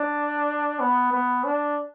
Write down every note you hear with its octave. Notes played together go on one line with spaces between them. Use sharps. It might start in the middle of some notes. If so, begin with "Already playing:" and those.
Already playing: D4
B3
B3
D4